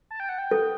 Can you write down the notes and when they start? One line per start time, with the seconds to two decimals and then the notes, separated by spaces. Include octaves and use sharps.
0.11 A5
0.20 G5
0.29 F#5
0.38 G5
0.51 A4